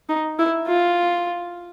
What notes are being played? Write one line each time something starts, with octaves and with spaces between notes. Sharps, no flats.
D#4
E4
F4